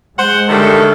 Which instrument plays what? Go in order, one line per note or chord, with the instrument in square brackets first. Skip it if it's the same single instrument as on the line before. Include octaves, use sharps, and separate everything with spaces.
[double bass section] G#3 [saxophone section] C5 F#5
[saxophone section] F#2 D#3 G3 [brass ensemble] D3 A3 A4